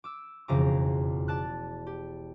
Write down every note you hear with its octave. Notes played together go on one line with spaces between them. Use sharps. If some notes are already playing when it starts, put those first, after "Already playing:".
D6 E6
E1 F2 C#3 A#5 D6
D5 A5 F#6
G4